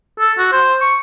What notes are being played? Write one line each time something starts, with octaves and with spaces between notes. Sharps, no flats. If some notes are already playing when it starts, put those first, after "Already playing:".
A4
F#4
C5
C#6